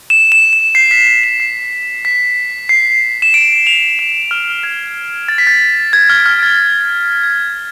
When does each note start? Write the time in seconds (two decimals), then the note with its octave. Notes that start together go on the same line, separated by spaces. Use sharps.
0.10 E7
0.32 E7
0.53 E7
0.75 C7
0.91 B6
1.07 C7
1.24 E7
1.40 C7
2.05 B6
2.69 C7
3.22 E7
3.34 D7
3.67 F7
3.99 E7
4.31 F6
4.63 G#6
5.28 A6
5.38 B6
5.47 A6
5.93 G#6
6.10 F6
6.26 F6
6.43 A6
7.23 G#6